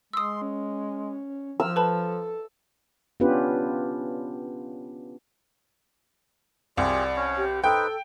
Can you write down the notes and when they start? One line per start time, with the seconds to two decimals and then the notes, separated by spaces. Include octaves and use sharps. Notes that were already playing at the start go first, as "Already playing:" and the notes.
0.13 G#3 C6 D#6 E6
0.42 C#4
1.60 F3 E6 F6
1.76 A4 B4 A5 B5
3.20 B3 C#4 D4 F4 G4 B4
6.77 C2 F4 G4 G#4 D5
7.16 C#4 C#5
7.37 G4
7.64 D#4 A4 B4 C5 G5